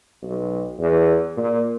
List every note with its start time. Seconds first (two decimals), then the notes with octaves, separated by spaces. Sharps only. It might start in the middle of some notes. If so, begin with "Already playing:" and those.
0.23 B1
0.79 E2
1.37 A#2